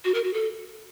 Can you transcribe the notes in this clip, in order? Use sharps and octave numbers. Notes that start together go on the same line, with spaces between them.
F#4
A#4
F#4
A4